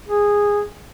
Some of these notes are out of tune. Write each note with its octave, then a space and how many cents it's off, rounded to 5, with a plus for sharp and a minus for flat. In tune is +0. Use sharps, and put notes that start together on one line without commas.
G#4 -15